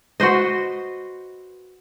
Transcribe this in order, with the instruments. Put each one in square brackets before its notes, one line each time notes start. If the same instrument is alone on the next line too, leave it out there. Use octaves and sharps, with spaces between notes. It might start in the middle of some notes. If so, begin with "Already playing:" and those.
[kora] F#4 B4 C5 D#5